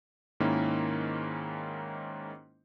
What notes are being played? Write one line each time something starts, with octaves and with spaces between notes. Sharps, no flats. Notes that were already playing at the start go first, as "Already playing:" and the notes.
G#2 D#3 A#3 C#4 E4